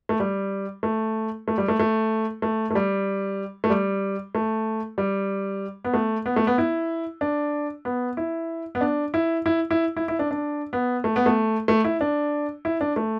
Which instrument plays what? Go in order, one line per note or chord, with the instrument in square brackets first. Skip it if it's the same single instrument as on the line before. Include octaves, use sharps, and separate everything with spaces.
[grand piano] A3
G3
A3
A3
G3
A3
A3
A3
A3
G3
A3
G3
A3
G3
B3
A3
B3
A3
B3
E4
D4
B3
E4
B3
D4
E4
E4
E4
E4
E4
D4
D4
B3
A3
B3
A3
A3
E4
D4
E4
D4
A3